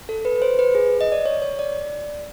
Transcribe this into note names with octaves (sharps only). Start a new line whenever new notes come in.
A4
B4
C5
B4
G#4
D#5
D5
C#5
C#5
D5